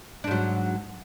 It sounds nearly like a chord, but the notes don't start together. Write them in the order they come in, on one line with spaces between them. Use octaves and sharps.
D4 G#2 F#3